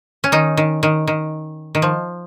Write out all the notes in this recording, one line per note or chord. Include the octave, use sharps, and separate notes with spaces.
C#4
D#3 D#4
D#3
D#3
D#3
D#3
F3